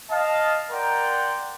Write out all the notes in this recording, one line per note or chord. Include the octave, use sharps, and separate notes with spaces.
D#5 F5 A5
A#4 D5 F#5 G5 A#5 C6